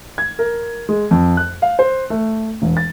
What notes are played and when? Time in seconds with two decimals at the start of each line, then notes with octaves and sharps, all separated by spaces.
0.18 G#6
0.39 A#4
0.89 G#3
1.11 F2
1.37 F#6
1.62 F5
1.79 C5
2.10 A3
2.62 E1
2.77 A6